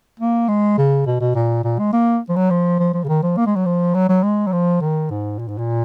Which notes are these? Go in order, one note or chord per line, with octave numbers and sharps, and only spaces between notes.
A#3
G#3
C#3
B2
B2
A#2
A#2
G#3
A#3
F3
F#3
F3
F3
F3
C#3
D#3
F3
A#3
G#3
F#3
F3
F#3
F#3
G#3
F#3
F3
D#3
G#2
A#2
G#2
A#2